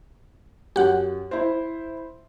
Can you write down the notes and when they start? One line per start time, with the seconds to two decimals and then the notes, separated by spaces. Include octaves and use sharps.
0.76 F#2 G4 F#5
1.31 E4 C5